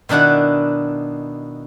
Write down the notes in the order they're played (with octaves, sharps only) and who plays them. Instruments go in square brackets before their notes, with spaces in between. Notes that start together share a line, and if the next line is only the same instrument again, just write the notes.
[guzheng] B2 D#3 D4 E4 F#5